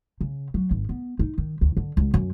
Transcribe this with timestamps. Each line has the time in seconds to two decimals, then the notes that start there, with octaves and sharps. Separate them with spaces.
0.21 C#3
0.54 F#3
0.71 G#1
0.89 B3
1.19 D#4
1.38 D#3
1.61 D2
1.77 D3
1.97 C#2
2.14 F#2